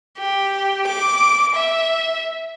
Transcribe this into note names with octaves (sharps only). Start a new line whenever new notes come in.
G4
D6
E5